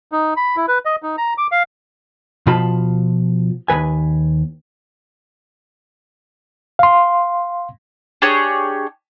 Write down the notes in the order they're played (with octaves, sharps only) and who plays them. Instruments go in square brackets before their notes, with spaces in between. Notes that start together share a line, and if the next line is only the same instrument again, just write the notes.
[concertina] D#4
B5
E4
B4
D#5
D#4
A#5
D6
F5
[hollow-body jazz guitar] B2 F3 F4 A5 B5
D#2 D#3 B4 G#5
[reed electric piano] F5 C6
[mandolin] D4 G4 G#4 C#5